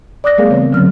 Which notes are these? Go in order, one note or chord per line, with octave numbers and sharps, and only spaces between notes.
D5 D6 D#6 F#6 A#6
G3 A3 B3 G#4 A#4 F5
C#3 E3 C4 B4 C#5
D3 F#3 A#3 C#4 F6